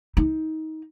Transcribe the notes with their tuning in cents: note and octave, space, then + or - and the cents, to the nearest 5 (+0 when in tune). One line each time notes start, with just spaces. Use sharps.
D#4 +25